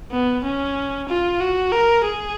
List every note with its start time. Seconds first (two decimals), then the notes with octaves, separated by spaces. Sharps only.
0.11 B3
0.44 C#4
1.09 F4
1.41 F#4
1.72 A#4
2.05 G#4